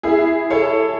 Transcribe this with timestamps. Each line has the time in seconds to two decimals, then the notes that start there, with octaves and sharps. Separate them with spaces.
0.03 E4 G#4
0.50 A4 C#5